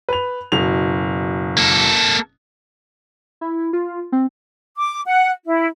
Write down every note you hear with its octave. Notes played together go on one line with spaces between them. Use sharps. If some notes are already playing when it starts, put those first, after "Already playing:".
B4 F7
F#1 B2 F7
A#3 A4
E4
F4
C4
D6
F#5
E4